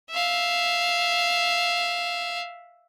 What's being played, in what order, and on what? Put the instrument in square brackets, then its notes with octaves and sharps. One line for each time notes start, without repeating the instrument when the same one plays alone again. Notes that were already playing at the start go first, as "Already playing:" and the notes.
[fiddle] E5 F5